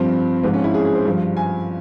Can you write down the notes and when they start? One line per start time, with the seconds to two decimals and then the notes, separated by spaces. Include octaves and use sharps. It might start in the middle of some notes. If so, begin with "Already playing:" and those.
Already playing: G2 F3 C4
0.44 G#2 F3 C4
0.54 C#4
0.64 E4
0.74 G#4
0.85 G#4
0.95 C5
1.05 G2 F3
1.37 G#5